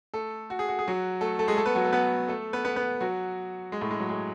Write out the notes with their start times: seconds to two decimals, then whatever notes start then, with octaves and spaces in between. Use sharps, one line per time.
0.14 A3 A4
0.50 F#4
0.59 G#4
0.68 F#4
0.79 G#4
0.88 F#3 F#4
1.21 A3 A4
1.39 A3 A4
1.48 G#3 G#4
1.57 A3 A4
1.66 B3 B4
1.75 F#3 F#4
1.84 A3 A4
1.93 B3 B4
2.28 A3 A4
2.53 B3 B4
2.65 B3 B4
2.76 B3 B4
3.00 F#3 F#4
3.72 G#3
3.81 A2 A3
3.91 G#3
4.00 F#3
4.09 G#3